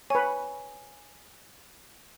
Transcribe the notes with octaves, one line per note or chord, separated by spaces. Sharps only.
B4 C#5 G#5